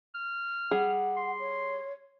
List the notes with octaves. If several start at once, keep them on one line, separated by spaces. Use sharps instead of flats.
F6
G3 G#4 F#5
C6
C#5